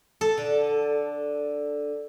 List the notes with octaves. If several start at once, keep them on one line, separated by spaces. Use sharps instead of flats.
A4
D3